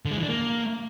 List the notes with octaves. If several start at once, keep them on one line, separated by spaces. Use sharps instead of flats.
D3
G#3
E3
D4
A#3